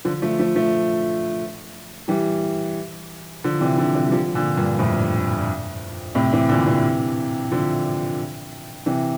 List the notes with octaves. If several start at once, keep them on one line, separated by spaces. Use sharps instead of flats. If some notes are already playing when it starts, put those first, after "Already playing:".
D3 F3
F3 A3
F3 A3
F3 A3
E3 G3
D3 F3
C3 E3
D3 F3
C3 E3
G3
D3 F3
A#2 D3
G2 A#2
F2 A2
A2 C3
C3 E3
A#2 D3
C3 E3
D3 F3
C3 E3